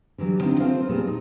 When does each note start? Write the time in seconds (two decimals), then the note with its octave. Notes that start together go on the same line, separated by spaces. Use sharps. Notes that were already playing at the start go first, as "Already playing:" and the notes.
0.18 D3 E3 F#3 G3
0.40 D3 B3 C4 D#4 E4
0.60 C4 F4 A4 B4 C5 F5
0.89 A#2 F3 G3 B3 G#4
1.07 D#4